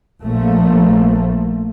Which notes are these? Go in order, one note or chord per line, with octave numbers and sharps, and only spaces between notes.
A#1 F3 A3 A#3